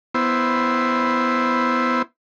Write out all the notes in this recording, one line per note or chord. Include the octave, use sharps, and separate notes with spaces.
B3 E4 C5